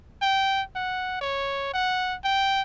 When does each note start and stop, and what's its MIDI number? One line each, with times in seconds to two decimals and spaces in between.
0.22 0.62 79
0.76 1.16 78
1.21 1.69 73
1.74 2.16 78
2.24 2.62 79